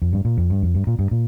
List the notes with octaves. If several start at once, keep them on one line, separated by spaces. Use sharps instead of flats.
F2
G2
A#2
F2
G2
F2
G2
A#2
G2
A#2